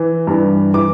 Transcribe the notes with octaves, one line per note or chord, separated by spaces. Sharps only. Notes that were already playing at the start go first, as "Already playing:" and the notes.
Already playing: E3
G2 E3
E3 D6